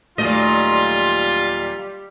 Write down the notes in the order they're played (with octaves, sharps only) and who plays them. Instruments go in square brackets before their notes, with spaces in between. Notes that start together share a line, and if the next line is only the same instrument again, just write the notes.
[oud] D#2 F#3 A3 [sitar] A#2 D#5 [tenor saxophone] G3 [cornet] F4